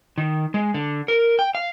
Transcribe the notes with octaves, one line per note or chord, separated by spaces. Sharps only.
D#3
G#3
D3
A#4
G5
F5